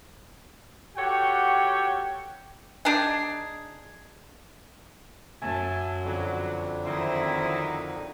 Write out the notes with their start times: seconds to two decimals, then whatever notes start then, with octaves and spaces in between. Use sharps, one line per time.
0.96 F#4 G4 A4 C#5 F#5 G5
2.85 D4 D#4 G#4
5.42 F#2 E5 G#5 A5
6.05 F2 D3 F#3
6.85 D#3 F#3 C4 D#4 E4